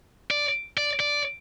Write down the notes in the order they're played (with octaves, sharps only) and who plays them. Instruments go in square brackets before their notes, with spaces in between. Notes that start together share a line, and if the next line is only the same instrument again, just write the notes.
[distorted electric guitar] D5
D5
D5